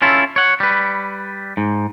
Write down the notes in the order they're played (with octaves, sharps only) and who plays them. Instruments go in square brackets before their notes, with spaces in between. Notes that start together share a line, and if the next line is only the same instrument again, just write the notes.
[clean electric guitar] C#4 E4 F4 A4
C#5 F#5
G3 B4
G#2